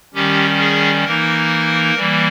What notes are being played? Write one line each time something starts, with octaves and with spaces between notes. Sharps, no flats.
D#3 G3 C#4 G4
G#4
E3 A#3 D#4 A#4
E3 G3 A#3